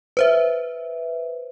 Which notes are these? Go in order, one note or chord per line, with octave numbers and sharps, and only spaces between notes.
B4 C5 E5